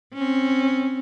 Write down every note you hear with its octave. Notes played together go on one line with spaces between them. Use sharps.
C4 C#4